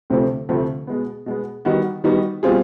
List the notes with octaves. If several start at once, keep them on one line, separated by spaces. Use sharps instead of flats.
D2 C3 F3 A3 C4
D2 C3 F3 A3 C4
B2 G#3 B3
B2 G#3 B3
D#3 G3 B3 D#4 F#4
D#3 G3 B3 D#4 F#4
B2 G3 C4 F4 G#4